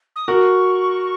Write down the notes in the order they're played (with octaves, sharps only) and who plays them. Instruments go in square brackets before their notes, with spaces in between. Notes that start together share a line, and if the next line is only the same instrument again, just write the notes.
[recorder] D#6
[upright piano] F#4 A#4 [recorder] C#6